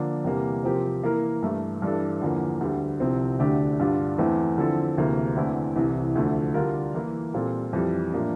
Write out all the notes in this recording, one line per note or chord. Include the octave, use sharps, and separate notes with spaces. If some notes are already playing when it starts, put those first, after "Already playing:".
Already playing: D3 F3 A#3 D4
E2 C3 G3 A#3
C3 F3 C4 G4 A#4
E3 A#3 E4 A#4
G2 E3 A3
G2 E3 G3 D4 A4
E2 D3 F3 A#3
D2 D3 G3
C2 C3 F3 C4
D2 D3 A3 D4 G4
G2 D3 G3 D4 F4
E2 E3 A3 C4 E4
D3 F3 C4 E4 A4
D2 C3 E3 A#3
E2 D3 A3 C4 E4
C2 C3 E3
D2 D3 F3 A3
D3 G3 D4 F4 A#4
E3 A#3 E4
A#2 G3 C4 F4 A4
F2 E3 G3
A2 F3 A#3 D4